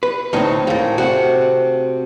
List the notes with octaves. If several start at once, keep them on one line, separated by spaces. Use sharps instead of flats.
B4
D2 A2 C4 D#4 C#5 C#6
D#2 A2 G#3 A#3 A#5
C3 A3 F#4 F#5